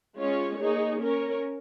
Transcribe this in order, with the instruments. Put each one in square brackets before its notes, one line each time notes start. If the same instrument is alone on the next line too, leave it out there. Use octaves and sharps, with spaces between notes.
[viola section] G#3 C#4 F4 C#5
A#3 D#4 G#4 C#5
C#4 A#4 C#5